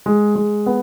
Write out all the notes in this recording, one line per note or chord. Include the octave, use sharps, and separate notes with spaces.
G#3
G#3
B3